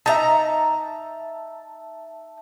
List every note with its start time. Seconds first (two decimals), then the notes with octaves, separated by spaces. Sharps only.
0.06 D#4 E5 A5 A#5